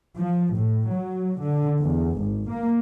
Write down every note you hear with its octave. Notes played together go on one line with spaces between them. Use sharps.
F3
A2
F#3
D3
E2
G#1
A#3